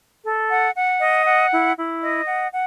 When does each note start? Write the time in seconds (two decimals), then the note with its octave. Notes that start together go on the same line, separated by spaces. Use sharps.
0.25 A4
0.50 F#5
0.75 F#5
1.01 D#5
1.26 F#5
1.51 E4
1.77 E4
2.02 D#5
2.26 F#5
2.52 F#5